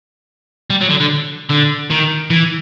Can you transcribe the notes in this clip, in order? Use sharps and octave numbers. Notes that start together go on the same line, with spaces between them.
G3
F#3
D3
D3
D3
D#3
E3